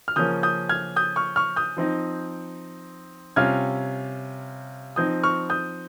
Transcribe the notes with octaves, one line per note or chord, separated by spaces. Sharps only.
F6
C#3 F3 A#3 C#4 D#6 G6
D#6 G6
F6 G#6
D#6 G6
C#6 F6
C#6 F6
D#6 G6
F3 C4 D#4
C3 G3 C#4 F4 F6 G#6
F3 C4 D#4 D#6 G6
C#6 F6
D#6 G6